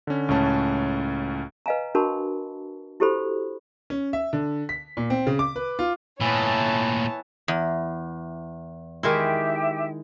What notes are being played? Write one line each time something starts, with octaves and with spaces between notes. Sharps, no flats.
D3 C#4
C#2 A2 C#4 A5
B4 D#5 F5 G#5 A#5
D4 F#4 A#4 A5 B5 C#6
E4 F#4 G4 A4 C5 B5
C#4
E5
D3
B6
A#2
C4
C#3
D6
B4
F4
A#2 E3 A3 B3 C#5 A5
E2
D#3 G#3 E4 G4 E5 G5